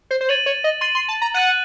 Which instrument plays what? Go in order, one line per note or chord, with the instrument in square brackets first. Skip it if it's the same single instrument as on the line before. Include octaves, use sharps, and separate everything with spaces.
[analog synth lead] C5
C5
[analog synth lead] C#5 [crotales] A6 D#7 F#7
[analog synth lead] C#5
D#5
[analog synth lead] C6 [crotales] A6 D#7 F#7
[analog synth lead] C6
A5
A#5
[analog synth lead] F#5 [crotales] F#6 A6 D#7 F#7